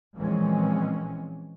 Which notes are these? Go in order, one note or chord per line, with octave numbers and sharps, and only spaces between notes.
A#2 E3 F3 G#3 C4 C#4